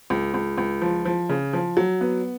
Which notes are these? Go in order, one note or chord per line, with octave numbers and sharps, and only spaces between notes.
C#2
C#2
C#2
F3
F3
C#3
F3
F#3
B3